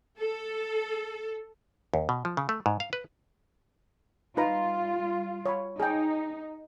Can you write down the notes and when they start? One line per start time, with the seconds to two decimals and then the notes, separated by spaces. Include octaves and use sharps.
0.19 A4
1.94 D#2
2.09 B2
2.25 F3
2.37 C#3
2.49 A3
2.66 G#2
2.80 F5
2.93 B4
4.37 G3 D#4 F4 B4 A#5
5.46 C#5 B5
5.80 D#4 G#4 G5